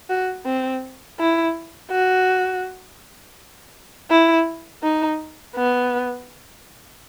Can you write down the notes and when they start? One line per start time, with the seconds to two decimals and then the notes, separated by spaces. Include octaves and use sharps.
0.10 F#4
0.46 C4
1.19 E4
1.91 F#4
4.10 E4
4.83 D#4
5.56 B3